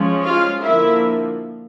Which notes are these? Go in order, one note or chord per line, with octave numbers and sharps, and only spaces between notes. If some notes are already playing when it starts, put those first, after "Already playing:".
Already playing: F3 G#3 C#4
F4 F5
D3 F3 A#3 E4 E5